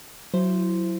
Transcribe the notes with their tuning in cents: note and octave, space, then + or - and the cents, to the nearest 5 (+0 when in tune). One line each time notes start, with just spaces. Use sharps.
F#3 +0 E4 +20 C5 +0